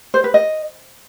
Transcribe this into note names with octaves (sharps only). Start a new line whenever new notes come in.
C5
B4
D#5